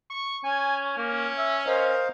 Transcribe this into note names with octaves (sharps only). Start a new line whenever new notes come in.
C#6
C#4 G#5
A#3 C#4
E5
A#4 C5 D#5 F5